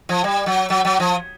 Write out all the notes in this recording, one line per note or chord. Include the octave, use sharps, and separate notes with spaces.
F3
G3
F#3
F#3
F#3
F3